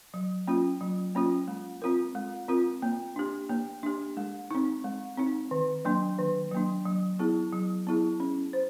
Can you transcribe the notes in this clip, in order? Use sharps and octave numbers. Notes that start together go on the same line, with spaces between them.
F#3
A#3 C#4 F4
F#3
A#3 C#4 F4
G#3
C4 F4 A#4
G#3
C4 F4 A#4
A#3
D4 G4
A#3
D4 G4
G#3
C4 D#4
G#3
C4 D#4
D#3
F#3 A#3 D4
D#3
F#3 A#3 D4
F#3
B3 E4 G#4
F#3
B3 E4 G#4
C#4
C5